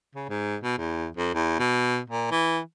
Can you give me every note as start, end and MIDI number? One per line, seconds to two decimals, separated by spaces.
0.15 0.26 49
0.29 0.56 44
0.63 0.77 47
0.78 1.07 40
1.17 1.30 41
1.34 1.55 40
1.59 1.99 47
2.10 2.29 46
2.31 2.59 52